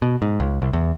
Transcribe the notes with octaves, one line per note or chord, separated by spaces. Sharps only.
B2
G#2
C#2
C2
E2